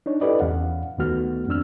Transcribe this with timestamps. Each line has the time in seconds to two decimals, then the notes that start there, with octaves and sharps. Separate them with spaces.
0.06 D4 D#4 C#5
0.21 E4 G4 A4 B4 D5 D#5
0.40 E2 C#4 F5 F#5
0.98 D2 D#3 A3 B3 F#4 F6
1.47 F2 C4 D4 E6 F6